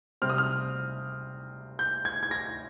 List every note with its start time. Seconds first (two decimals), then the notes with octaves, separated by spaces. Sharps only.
0.22 C3 G3 C4 F6
0.30 D#6
0.38 F6
1.79 G6
2.05 G#6
2.23 G#6
2.31 A#6